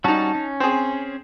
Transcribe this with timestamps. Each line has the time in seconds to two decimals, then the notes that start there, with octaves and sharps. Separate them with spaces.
0.04 G3 C#4 D#4 F#4 A5
0.35 C#4
0.60 C4 G#4